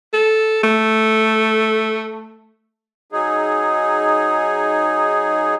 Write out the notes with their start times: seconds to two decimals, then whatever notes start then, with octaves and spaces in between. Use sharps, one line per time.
0.14 A4
0.63 A3
3.12 F#3 D#4 G#4